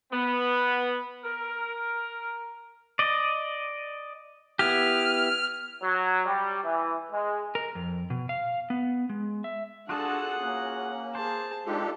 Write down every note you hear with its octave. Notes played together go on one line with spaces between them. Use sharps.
B3
A#4
D5 D#5
B3 E4 G4 F6
F#3
G3
E3
G#3
A#4
F2
B2
F5
B3
G#3
E5
D4 F4 F#4 G#4 A4 F#5 A5
A#3 C#4
G#4 C5 A5
G#3 D4 D#4 F4 G4 A4